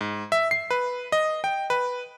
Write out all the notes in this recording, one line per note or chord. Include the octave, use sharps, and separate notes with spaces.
G#2
E5
C7
B4
D#5
G5
B4